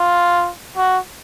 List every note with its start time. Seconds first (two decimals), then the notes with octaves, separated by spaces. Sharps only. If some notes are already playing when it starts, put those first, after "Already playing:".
Already playing: F4
0.77 F#4